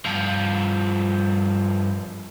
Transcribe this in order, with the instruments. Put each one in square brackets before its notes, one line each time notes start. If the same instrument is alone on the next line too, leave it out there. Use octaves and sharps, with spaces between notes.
[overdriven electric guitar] G2 F3